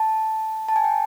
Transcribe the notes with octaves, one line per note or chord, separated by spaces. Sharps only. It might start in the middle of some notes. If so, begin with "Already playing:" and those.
Already playing: A5
A5
G#5
G5